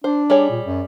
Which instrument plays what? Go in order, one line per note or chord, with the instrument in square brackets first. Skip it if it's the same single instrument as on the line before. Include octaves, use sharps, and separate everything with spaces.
[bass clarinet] D4 [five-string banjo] C5
[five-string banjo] G3 G#4 C#5
[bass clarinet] A#2
F#2